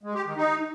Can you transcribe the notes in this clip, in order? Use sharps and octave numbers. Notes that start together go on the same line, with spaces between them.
G#3
G4
D#3
D#4